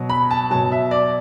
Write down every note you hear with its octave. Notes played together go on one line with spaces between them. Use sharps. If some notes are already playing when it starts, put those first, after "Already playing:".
Already playing: B2 F#3
B5
A5
B2 F#3 A5
E5
D5